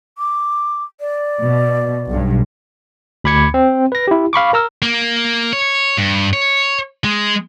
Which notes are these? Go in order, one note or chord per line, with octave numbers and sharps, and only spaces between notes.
D6
D5
B2
B1 G2
D2 B5 D6 G#6 C#7
C4
B4 A#6
E4 G4
F5 B5 C#6 D6
A#4 A#5 E6 F6
A#3
C#5
G2
C#5
G#3